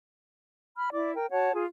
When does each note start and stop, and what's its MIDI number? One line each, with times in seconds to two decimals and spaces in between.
0.77 0.90 83
0.77 0.90 89
0.92 1.13 64
0.92 1.13 74
0.92 1.13 86
1.15 1.26 70
1.15 1.26 79
1.31 1.51 66
1.31 1.51 73
1.31 1.51 78
1.31 1.51 81
1.53 1.64 65
1.53 1.64 68